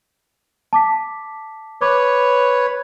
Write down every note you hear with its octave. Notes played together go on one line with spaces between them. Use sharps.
A5 D6 B6
B4 C#5 D6